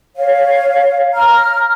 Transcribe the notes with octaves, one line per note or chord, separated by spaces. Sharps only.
C#5 F5
A#5 F6